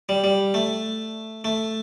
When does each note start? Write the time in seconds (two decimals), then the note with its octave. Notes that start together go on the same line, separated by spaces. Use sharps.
0.09 G3
0.24 G3
0.54 A3
1.44 A3